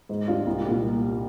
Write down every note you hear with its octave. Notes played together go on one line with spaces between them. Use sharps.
G#2
G3 D4 F4
C2
A#2 G3